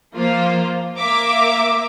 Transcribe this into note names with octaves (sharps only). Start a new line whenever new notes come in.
F3 A#3 F4 C5
A#3 A#4 E5 D6